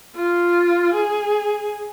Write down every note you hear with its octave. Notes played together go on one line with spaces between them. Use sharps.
F4
G#4